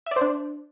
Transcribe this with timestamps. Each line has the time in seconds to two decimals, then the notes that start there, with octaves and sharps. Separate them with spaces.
0.06 E5
0.11 D5
0.16 C5
0.21 D4